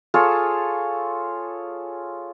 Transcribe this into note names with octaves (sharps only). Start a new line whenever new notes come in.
F4 G#4 A4 C#5